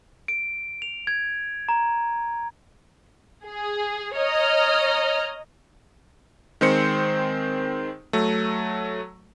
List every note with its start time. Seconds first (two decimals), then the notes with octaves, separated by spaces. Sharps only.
0.28 D7
0.82 F7
1.07 G#6
1.69 A#5
3.44 G#4
4.16 C#5 D#5 A#5 F6
6.61 D#3 G#3 C4 C5 C#7
8.13 F#3 A3